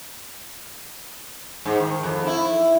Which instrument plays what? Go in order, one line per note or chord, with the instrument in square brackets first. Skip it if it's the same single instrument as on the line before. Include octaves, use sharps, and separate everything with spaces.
[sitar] G#2
D#3
F2
E4